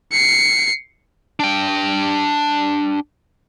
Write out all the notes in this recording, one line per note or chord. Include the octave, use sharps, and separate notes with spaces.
C7 C#7
D4 G5